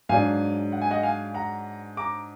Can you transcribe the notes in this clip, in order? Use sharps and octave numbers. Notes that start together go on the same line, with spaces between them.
G#2 F#3 D4 F5 G#5
F#5
G#5
D#5 F#5
F5 G#5
F#5 A#5
A#5 D6